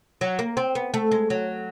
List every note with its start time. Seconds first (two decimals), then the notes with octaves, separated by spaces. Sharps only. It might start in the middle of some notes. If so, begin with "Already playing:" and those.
0.21 F#3
0.39 A#3
0.57 C4
0.75 B3
0.94 A3
1.11 G#3
1.30 F#3